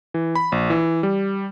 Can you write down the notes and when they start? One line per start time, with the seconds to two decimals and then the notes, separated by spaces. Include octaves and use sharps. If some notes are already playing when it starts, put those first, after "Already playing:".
0.14 E3
0.35 B5
0.52 A#1
0.70 E3
1.03 G3